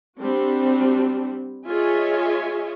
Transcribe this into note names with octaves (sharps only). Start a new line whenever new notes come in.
G3 C4 D4 F#4
F4 G#4 C#5 D#5 E5 G#5